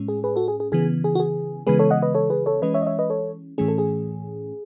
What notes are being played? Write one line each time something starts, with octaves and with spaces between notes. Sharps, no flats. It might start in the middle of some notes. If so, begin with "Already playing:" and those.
Already playing: A2 G#3 C#4
G#4
G#4 B4
F#4 A4
G#4
G#4
C#3 E3 B3 G#4
G#4
F#4
G#4
C#3 E3 G#3 B3 G#4 B4
A4 C#5
D#5 F#5
B4 D#5
A4 C#5
G#4 B4
A4 C#5
E3 G#3 C#4 B4 D#5
C#5 E5
D#5
C#5 E5
B4 D#5
A4 C#5
A2 E3 A3 C#4 G#4
A4
G#4